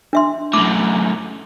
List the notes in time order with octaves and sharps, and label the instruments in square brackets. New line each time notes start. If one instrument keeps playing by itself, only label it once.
[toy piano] D4 E5 C6
[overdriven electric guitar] F#2 A2 [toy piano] D6